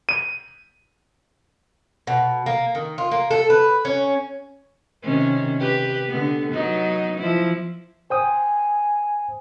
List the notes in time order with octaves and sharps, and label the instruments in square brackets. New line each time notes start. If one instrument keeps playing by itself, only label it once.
[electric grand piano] D#7
[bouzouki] B2
A#3
D#3
F4
A#3
A4
B4
C#4
[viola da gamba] C3 D#3 C#4
G4 B4
D3 B3
F#3 B3 D#4
F3 E4
[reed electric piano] C5 G5 D#6 [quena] G#5